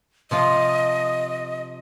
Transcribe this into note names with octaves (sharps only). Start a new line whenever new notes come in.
C3 F3 F4 D#5